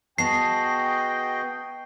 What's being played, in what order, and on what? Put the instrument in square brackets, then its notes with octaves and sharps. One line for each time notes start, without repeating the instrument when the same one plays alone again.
[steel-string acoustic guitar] B3 A5 [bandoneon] F#4 G#4 D#5 [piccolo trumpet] G5 [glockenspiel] C7